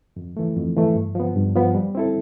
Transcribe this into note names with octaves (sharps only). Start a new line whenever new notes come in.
F2
E3 A3
F2
E3 A3
G2
F3 B3
G2
F3 B3
G3
C4 E4 A4